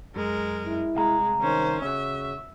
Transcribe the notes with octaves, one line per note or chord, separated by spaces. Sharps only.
F#2 G#3 A#4
E4
C2 G#3 F5 A#5
D#3 C#4 C5
C#3 C#4 F#4 E5